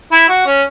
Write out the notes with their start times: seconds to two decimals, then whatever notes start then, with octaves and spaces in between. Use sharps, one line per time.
0.12 E4
0.29 F#4
0.47 C#4